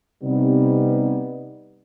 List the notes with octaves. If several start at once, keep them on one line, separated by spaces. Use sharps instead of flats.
C3 G3 B3 D#4